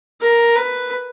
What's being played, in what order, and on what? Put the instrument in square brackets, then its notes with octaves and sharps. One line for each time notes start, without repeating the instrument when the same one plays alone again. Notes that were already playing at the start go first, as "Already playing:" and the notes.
[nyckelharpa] A#4
B4